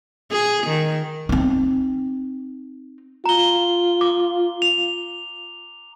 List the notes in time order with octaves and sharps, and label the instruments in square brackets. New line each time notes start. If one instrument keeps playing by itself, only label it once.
[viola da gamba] G#4
D#3
[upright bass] C4 D#4
[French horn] F4 [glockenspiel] A#5 G7
[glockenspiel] D6
F7